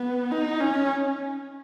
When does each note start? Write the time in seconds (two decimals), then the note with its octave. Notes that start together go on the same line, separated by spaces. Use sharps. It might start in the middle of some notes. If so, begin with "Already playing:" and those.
Already playing: B3
0.32 D#4
0.60 C#4